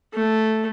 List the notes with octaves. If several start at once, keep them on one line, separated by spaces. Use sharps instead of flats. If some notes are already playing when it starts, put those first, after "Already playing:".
A3